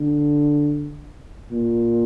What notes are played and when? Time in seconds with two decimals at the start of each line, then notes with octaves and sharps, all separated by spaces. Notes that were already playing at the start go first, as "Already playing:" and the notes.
Already playing: D3
1.52 A#2